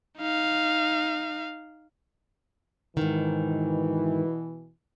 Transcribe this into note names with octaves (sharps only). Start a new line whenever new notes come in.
D#4 F5
G#2 B2 D#3 E3